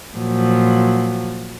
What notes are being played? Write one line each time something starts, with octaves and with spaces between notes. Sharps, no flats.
A#2 F3 F#3